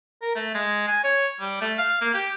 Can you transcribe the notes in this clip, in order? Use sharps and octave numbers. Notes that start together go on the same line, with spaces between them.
A#4
A3
G#3
G#5
C#5
G3
A3
F5
A#3
G4